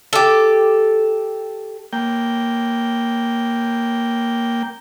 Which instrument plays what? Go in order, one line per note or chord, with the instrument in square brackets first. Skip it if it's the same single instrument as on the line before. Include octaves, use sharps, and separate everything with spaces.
[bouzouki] G4 A4
[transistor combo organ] A#3 G5